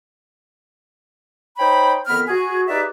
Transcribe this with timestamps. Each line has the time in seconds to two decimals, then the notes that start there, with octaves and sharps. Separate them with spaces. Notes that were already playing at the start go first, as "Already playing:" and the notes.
1.57 D#4 C5 C#5 G5 B5
2.07 F2 D#3 B3 B5 F6
2.28 F#4 G#4
2.69 D#4 G4 G#4 B4 D5 E5